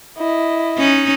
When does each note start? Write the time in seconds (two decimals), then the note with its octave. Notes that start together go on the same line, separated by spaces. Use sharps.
0.18 E4 D#5
0.78 C#4 D#4